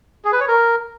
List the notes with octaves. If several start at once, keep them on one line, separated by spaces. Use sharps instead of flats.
G#4
B4
C#5
A#4